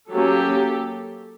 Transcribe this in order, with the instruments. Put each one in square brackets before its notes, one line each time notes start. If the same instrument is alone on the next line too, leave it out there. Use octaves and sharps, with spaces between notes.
[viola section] F#3 A#3 C#4 G4 A4